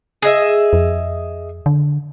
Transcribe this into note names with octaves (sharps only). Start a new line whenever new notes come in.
G#4 D#5 E5
F2
D3